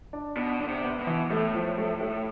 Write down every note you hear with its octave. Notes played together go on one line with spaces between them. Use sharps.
D4
B2 D4
D3 D4
C3
B3
B2
E3
A2 A3
F3
A3
A3